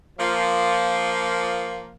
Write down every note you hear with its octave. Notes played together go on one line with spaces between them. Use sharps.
F3 A#3